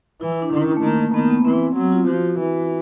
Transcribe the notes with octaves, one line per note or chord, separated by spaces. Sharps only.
E3 E4
E4
D4
D#3 C#4
A3
D#3 A#3
D#3 B3
B3
E3 C4
F#3 C4
F4
F3 F#4
E3